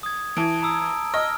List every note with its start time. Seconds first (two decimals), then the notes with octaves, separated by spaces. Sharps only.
0.03 D#6 G#6
0.37 E3 A5 D7
0.62 A#5 D#6 E6
1.14 D#5 E6 F6